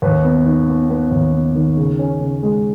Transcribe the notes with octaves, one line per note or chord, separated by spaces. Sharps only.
D#2 B4
B3
D#3
B3
B3 B4
D#2
B3
D#3
C#3
C#4
C#3
G#3